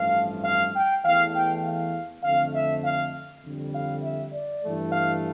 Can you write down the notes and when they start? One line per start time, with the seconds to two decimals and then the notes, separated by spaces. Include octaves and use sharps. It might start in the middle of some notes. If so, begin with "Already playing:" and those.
Already playing: A1 G2 F3 A3 F5
0.44 F5
0.74 G5
1.04 E2 E3 A3 F5
1.33 G5
1.64 F5
2.23 F2 D3 A3 F5
2.53 E5
2.83 F5
3.43 F2 D3 G3
3.73 F5
4.03 E5
4.33 D5
4.63 G2 E3 A3
4.92 F5